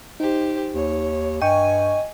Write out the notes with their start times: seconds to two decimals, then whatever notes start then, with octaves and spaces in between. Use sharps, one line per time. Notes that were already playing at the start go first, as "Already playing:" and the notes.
0.20 D#4 G4 C5
0.73 D#2 C#5
1.42 G2 D#5 G5 G#5 C#6